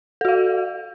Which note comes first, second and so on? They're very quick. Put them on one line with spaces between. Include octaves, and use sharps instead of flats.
A4 F#4 F5